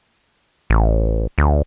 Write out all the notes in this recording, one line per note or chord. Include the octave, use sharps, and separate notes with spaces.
A1
D2